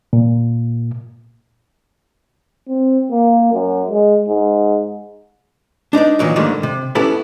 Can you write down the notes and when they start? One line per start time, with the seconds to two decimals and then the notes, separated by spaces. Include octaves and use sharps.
0.13 A#2
2.68 C4
3.11 A#3
3.53 F#2
3.91 G#3
4.28 G#2
5.93 D4 D#4 B4 D5
6.19 A#2 D#3 E3 F#3
6.36 G#2 D3 D#3 G3 A3 A#3
6.63 C3
6.95 B3 C#4 E4 G4 A4 B4